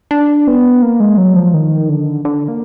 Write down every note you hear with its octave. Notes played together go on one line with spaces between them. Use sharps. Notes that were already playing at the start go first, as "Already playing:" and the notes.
D4
B3
A#3
G#3
F#3
F3
D#3
D3
D3
A#3